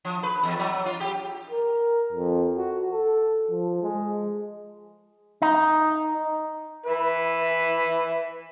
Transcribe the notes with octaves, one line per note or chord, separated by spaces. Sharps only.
F3
B4
E2
F#3
F4
G4
A#4
F2
F#4
A4
F3
G#3
D#4
B4 E5